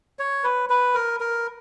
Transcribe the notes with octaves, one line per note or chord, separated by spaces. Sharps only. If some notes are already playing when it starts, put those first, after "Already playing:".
C#5
B4
B4
A#4
A#4